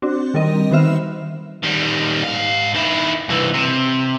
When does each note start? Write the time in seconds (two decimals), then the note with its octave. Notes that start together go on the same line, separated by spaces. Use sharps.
0.02 C4 D4 F#4
0.34 D#3 G3 C4 A#4 D#5
0.71 D#3 B3 F#4 C5 E5 F6
1.63 D#3 G3
2.24 G#2 F5
2.74 D#3 E4
3.29 C2 E3
3.54 C3